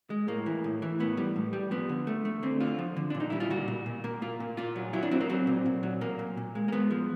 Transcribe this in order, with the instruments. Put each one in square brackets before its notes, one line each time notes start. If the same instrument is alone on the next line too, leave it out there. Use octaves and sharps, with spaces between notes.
[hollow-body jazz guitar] G#3
A2 A#3
E3
A2
E3
A2 B3
G3
A2
G3
F3 B3
D3
A3
A3
D3 C4
D3 F4
F3
D3
A#2 D4
D#4
G3 E4
F4
A#2 F#4
A#2
A#2
A#3
A#3 F4
A#2
A#2 F4
F#3
F#3 E4
D4
F#3 C4
A#3
F#3 C4
A#2
A#2
F#3
A#2 A#3
A#2
A#2
G#3
A#3
G#3 B3
F3